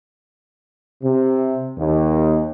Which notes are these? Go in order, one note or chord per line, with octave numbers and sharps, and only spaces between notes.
C3
D#2